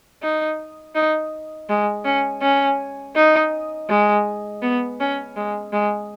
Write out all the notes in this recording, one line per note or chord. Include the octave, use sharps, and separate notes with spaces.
D#4
D#4
G#3
C#4
C#4
D#4
G#3
B3
C#4
G#3
G#3